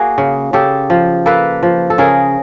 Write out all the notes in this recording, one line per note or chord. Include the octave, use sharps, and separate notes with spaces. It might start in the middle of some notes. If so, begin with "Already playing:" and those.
Already playing: A#3 F#4 G#4
C#3
C#3 G4 A4
F3
A#3 A4 B4
F3
A4
C#3 G#4 A#4